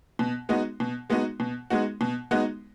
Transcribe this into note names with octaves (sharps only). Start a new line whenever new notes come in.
B2
G#3 B3 D#4 F#4
B2
G#3 B3 D#4 F#4
B2
G#3 B3 D#4 F#4
B2
G#3 B3 D#4 F#4